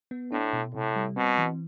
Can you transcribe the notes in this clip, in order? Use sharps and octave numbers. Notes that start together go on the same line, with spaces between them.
B3
A2 D4
B2
A2 C3
G3
B2 C4
E3